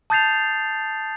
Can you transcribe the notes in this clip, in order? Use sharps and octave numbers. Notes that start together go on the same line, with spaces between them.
A5 D#6 G6 A6 C7 F7